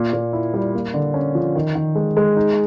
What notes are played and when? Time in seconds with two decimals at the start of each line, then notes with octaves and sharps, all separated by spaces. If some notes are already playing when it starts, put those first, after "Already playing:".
Already playing: A#2
0.13 A#2
0.33 E4
0.54 G3
0.75 A#3
0.94 D3
1.14 C#4
1.35 F3
1.55 D#3
1.75 D#3
1.95 G#3
2.17 G#3
2.36 D#4